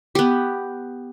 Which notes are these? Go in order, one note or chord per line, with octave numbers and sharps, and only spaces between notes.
B3 G4